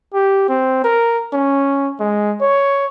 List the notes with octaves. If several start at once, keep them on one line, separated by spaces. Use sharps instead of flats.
G4
C4
A#4
C#4
G#3
C#5